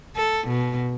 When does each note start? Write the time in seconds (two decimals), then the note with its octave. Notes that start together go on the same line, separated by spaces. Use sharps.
0.16 A4
0.48 B2